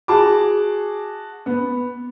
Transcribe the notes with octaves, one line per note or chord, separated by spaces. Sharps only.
F#4 G#4 A5 D6
B3